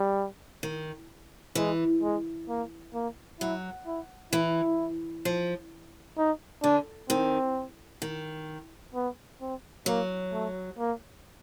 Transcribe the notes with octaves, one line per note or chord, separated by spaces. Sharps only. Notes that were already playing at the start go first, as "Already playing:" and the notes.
Already playing: G3
D#3
E3 G#3
G#3
A#3
A#3
F#3 E4
E4
E3 E4
F3
D#4
D3 D4
D#3 C4
D#3
B3
C4
F#3 A#3
A3
A#3